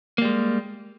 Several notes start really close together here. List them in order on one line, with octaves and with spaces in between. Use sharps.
A#3 G3 G#3